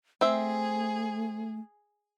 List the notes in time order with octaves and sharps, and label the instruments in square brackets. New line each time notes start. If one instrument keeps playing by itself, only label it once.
[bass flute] A3 [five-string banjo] C4 E5 [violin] G#4